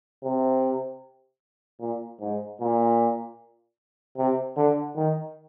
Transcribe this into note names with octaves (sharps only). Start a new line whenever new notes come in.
C3
A#2
G#2
A#2
C3
D3
D#3